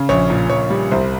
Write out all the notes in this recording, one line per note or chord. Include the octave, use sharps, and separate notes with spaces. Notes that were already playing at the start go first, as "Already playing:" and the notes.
Already playing: C#3
A#1 C#5
A#2
A#1 C#5
G3
C2 C5